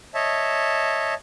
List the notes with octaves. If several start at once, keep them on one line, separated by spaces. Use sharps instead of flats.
C#5 D#5 E5 A5